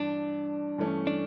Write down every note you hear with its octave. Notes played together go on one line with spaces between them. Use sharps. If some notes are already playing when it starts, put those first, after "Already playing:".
Already playing: G2 E3 D4
G2 E3 A3 C#4
D4